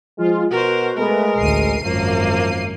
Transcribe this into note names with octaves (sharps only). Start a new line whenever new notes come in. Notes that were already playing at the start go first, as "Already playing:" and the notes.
F3 G#3 F4
B2 F#4 A#4 C5
G#3 A3 B3 A#4 B4
A1 D2 C7 D#7
G#1 F#2 F3 A#3